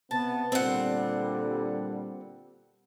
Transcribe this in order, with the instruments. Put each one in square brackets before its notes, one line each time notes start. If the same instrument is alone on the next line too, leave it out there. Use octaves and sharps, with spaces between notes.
[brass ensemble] C3 B3 [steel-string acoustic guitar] A5
[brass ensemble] A#2 D3 G3 [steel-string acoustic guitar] C4 F#5